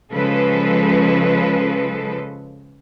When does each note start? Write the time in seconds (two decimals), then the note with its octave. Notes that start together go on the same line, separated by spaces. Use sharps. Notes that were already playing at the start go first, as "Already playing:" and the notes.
0.13 C#3 F3 G#3 A4 B4